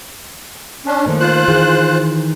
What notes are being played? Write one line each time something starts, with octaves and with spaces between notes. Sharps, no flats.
C#4 D4
D#3 F3 A3 A#3
F4 C5 F#6
D#3 E3 G#4